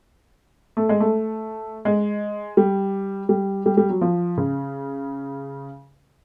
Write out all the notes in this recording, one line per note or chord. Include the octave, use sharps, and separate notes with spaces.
A3
G#3
A3
G#3
G3
G3
G3
G3
F#3
F3
C#3